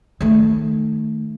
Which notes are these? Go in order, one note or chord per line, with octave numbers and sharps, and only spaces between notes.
D#3 A3